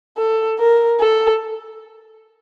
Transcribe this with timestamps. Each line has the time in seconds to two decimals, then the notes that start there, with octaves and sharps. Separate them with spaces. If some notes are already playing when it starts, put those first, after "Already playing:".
0.17 A4
0.59 A#4
1.00 A4